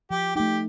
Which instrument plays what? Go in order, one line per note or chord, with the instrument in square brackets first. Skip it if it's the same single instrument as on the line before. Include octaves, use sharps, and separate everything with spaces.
[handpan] F3 [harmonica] G4
[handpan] A3 D#4 [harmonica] G4